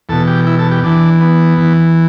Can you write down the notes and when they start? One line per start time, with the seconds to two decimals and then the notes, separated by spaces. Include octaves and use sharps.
0.09 E2 B2 A4
0.27 G4
0.47 E4
0.59 A4
0.71 G4
0.84 E2 E3 D4
1.21 B3
1.58 E2 E3